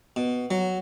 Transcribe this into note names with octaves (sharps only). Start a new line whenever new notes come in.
B2
F#3